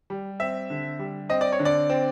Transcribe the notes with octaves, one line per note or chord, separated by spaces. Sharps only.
G3
C4 E5
D3
G3
C4 D#5
D5
C#5
D3
D5
C4